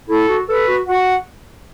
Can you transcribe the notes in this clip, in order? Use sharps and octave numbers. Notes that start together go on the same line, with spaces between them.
E4 A4
F#4
A4 B4
F#4
F#4 F#5